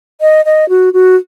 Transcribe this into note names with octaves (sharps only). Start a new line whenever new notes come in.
D#5
D#5
F#4
F#4